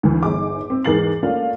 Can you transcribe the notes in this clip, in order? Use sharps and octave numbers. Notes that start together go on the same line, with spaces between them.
D2 E3
G1 D#4 G#4 D6
C4
E2 G#2 A#4 A6 C7 F#7
A3 A#3 C#4 D4 F4 F5